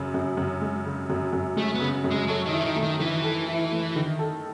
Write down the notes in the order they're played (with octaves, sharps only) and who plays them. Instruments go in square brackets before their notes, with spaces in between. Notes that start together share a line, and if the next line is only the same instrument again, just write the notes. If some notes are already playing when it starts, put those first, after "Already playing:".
Already playing: [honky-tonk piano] F#2 C#3
F#2
F#2
G#3
C#3
F#2
F#2
[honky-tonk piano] G#3 [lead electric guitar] A3
[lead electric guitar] B3
[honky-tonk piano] C#3
F#2
[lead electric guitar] G#3
[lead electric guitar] F#3 [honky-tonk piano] A4
[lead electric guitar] D#3
[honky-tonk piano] E4
[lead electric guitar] E3
D#3
[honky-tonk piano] A3
[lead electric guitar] D#3
[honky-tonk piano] D#3 [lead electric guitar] E3
[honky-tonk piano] A4
E4
A3
D#3
A4